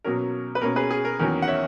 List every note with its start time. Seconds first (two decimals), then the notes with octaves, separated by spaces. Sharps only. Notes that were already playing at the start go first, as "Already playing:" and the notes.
0.04 B2 F#3 A#3 C#4 A#4
0.55 B4
0.61 B2 A#3 C#4 A#4
0.76 G#4 B4
0.91 G#4
1.05 A#4
1.20 E2 D#3 F#3 A#3 C#4 A#4
1.42 F#5
1.48 C#5 E5